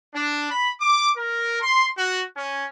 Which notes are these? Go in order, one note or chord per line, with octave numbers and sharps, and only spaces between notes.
D4
B5
D6
A#4
C6
F#4
C#4